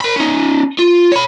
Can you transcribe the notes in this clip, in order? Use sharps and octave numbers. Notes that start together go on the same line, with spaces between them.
A#4 B5
C#4 D#4
F4
C#5 B5